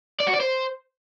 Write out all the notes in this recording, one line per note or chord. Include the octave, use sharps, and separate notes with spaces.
D5
F#4
D5
C5